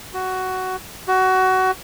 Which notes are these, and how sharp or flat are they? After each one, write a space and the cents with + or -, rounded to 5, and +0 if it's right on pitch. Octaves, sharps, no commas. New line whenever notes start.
F#4 +10
F#4 +20